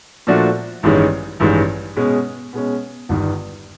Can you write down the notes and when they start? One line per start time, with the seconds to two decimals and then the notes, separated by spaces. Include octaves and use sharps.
0.27 A#2 F3 A3 D4 F#4
0.83 A1 G2 D#3 G#3 C#4
1.40 A1 G2 D#3 G#3 C#4
1.97 B2 G#3 C#4
2.53 B2 G#3 C#4
3.09 G1 G2 D#3